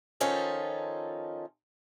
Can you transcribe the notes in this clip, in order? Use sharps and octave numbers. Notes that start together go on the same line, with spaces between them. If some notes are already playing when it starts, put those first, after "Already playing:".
D#3 F3 C#4 D#4 F4 A4